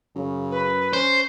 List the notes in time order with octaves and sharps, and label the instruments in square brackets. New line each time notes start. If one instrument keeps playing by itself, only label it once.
[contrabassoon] F#2 [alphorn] C#3
[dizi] B4
[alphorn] C#4 [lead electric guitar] C5